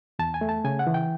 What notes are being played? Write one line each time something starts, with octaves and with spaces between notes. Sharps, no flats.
E2 A5
G#5
A3
A5
C#3 G#5
F#5
E3
G5